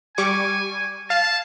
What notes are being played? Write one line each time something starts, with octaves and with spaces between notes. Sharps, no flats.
G3 G#5 C#6 D6
F5 A5